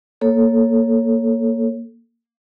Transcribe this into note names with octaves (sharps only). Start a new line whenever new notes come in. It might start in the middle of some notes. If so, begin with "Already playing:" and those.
A#3 A4 C#5